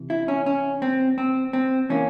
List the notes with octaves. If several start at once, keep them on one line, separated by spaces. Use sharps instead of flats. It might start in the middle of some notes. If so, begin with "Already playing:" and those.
Already playing: C3 E3
E4
C#4
C#4
C4
C4
C4
E3 A#3 C#4